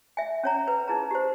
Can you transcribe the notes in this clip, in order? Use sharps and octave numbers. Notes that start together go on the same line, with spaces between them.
E5 G#5
C#4 C#5 A#5
B4
D#4 E4 G#4 A#5
G4 C5